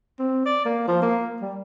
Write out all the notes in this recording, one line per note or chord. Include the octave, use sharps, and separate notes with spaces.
C4
D5
A#3
F3
A#3
G3